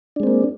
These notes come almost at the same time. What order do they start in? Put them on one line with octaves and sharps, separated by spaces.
D4 G#3 C4 A#3